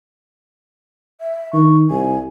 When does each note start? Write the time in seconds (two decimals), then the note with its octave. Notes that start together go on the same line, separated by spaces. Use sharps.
1.21 E5
1.53 D#3 C#6
1.90 C2 G#5